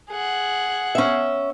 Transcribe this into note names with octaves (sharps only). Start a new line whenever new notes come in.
G#4 F#5
C#4 E5